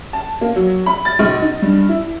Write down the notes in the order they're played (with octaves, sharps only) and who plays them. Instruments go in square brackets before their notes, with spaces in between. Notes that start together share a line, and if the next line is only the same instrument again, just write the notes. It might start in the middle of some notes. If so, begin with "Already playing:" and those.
[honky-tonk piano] A5
A#3
F#3
B5
A6
B1
D#4
G2
E4